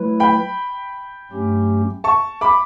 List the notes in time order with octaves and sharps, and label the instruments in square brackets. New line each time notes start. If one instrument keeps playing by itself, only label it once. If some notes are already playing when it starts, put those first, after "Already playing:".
Already playing: [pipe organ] F#3 A3 E4 B4
[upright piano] G5 B5
[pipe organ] G2 F#3 A3 C#4 G4
[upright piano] A5 C#6
B5 D6